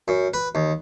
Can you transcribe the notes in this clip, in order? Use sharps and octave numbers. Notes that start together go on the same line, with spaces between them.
F#2
B4
D#2